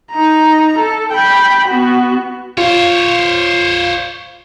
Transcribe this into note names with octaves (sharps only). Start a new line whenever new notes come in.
D#4 A#5
A4
G5 B5
B3 F#4
F4 C5 C#5